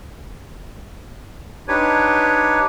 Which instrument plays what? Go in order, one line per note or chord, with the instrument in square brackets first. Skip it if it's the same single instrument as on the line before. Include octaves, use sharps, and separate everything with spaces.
[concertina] D4 D#4 G4 B4 C#5